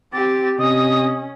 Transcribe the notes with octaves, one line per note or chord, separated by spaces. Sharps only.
C4 G4 D6 A6
C3 C#4 D#5 D#6